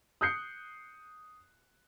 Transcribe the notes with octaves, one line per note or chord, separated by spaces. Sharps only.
D#6 F#6 G6 C7 C#7